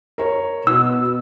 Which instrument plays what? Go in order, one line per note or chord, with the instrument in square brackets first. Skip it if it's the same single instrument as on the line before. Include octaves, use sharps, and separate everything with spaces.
[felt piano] A#4 C#5
[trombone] B2 [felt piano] B3 [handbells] E6